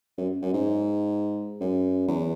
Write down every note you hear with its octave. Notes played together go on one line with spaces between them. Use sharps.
F#2
F#2
G#2
F#2
E2